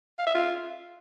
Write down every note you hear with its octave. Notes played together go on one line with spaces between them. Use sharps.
F5
E5
F4